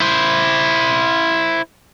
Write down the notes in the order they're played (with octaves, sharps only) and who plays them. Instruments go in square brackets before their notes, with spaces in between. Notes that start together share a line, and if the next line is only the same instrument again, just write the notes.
[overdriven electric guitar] E4 C5